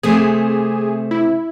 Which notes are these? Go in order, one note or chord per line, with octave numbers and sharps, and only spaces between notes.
C3 A3 C4 G#4
E4